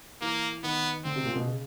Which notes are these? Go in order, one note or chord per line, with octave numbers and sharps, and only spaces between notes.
E3 A#3
D#3 B3
D3 C4
C3
A#2
B2
C#3